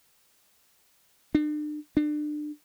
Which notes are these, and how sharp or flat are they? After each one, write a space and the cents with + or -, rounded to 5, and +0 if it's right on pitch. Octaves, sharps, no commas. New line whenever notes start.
D4 +40
D4 +30